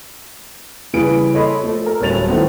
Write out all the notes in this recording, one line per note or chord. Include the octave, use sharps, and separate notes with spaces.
C#3 E3 G3 G#4 B4 D7
A4 C#5 D#5 B5 C6
F3 A3
A4 A#4
D1 G3 C#4 A6 F7
A2 D#3 F3 A3 B3 C4